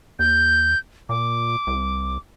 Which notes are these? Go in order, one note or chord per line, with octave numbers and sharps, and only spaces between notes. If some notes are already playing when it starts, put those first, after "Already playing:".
D#2 G6
A#2 D6
C2